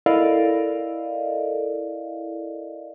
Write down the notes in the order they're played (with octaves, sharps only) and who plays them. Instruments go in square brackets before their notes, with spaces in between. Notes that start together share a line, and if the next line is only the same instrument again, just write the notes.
[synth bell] E4 A4 A#4 D5 D#5 F5